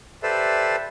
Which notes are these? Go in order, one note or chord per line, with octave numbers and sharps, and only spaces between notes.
G4 A4 B4 C5 D5 E5